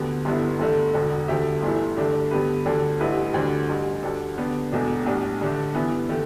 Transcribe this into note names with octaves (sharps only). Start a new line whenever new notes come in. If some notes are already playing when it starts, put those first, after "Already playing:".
Already playing: D2 D3 B3 G4
G1 G2 D3 B3 E4
G1 G2 D3 A3
E1 D2 D3
D2 D3 A3 G4 E5
G1 G2 E3 A3 E4
G2 D3 A3 D4 G4
G2 D3 B3 G4 B4
D2 D3 G3 D4 A4
A1 G2 G3 E4 B4
D2 D3 G3 D4
A1 G2 G3
D2 D3 G3 D4 A4
D3 B3 D4 G4
E1 E2 B2 A3 D4
B1 A2 G3 D4
G2 D3 A3 D4
G2 E3 B3 E4
D3 A3 G4